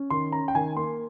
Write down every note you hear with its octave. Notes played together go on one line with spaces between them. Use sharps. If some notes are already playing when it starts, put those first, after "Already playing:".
Already playing: C#4
D#3 C6
C#4 A#5
G5
D#3 G#5
A#3 C6